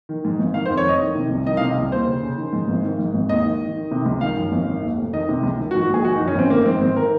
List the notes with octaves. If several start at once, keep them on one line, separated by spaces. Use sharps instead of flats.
D#3
G#2
G#1
D#3 F5
C5
F2
C#5
F1 D#5
D#3
C3
C2
D#3 D#5
F5
C3
D#5
C2
D#2 C5
C#3
C#3
D#3
G#2
G#1
D#3
G#2
G#1
D#2 D#5
D#3
D#3
D#3
C3
C#2
D#3 F5
F#2
G#1
D#3
D#2
F1
D#3 D#5
C3
C#2
D#3
F#4
G#2
F#4
A#1 G#4
D#3 F#4
D#4
F#2
C#4
G#1 C4
D#3 A#3
G#2 C4
G#1 C4
D#3 A#4